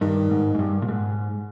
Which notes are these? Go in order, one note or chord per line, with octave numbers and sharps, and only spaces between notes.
G2 D#3
G#2
G#2
G2
A#2
G#2